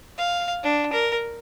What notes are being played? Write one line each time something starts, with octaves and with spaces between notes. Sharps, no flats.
F5
D4
A#4